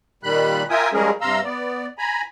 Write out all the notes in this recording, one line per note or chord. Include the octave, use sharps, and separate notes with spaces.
A#2 D#3 G3 B5 F#6
F4 A#4 E5 G5 G#5 D#6
F3 G3 G#3 C#4 G#4 A#4
G2 C3 F5 A#5 C6 E6
B3 D5
G#5 A#5 B5